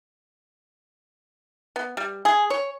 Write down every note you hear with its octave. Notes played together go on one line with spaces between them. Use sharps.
B3
G3
G#4
C#5